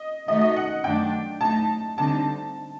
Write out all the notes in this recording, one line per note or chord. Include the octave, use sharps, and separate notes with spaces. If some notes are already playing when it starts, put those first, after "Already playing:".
Already playing: D#5
D#3 A3 D#4 F#4 D#5
D#5
F#5
F#2 D#3 A3 D4 G5
A2 A3 D#4 A5
D3 G3 C4 D#4 A5